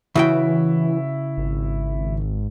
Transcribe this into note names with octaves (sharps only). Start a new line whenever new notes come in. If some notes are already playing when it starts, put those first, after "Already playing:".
C#3 E3 E4 F#4 G5
G#1